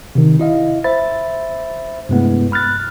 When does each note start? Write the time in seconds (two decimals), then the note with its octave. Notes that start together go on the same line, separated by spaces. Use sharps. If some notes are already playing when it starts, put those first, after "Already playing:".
0.15 C3 D#3
0.39 E4 D#5 F5
0.84 C5 E5 B5 A6
2.09 G2 C3 G#3 A3 B3 E4
2.52 B5 F6 F#6 A6